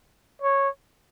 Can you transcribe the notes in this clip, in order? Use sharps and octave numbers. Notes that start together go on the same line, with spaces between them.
C#5